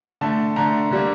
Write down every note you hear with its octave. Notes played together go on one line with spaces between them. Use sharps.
D3 A3 A5
D3 A3 A#5
D3 G3 A#3